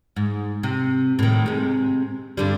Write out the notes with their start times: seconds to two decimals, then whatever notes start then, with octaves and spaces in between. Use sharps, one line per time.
0.16 G#2
0.63 C3
1.19 A2 D#3
1.46 C3 G#3
2.37 G2 D3 G3